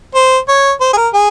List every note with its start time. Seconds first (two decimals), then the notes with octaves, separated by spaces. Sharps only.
0.15 C5
0.48 C#5
0.81 C5
0.93 G#4
0.97 A#4
1.14 G#4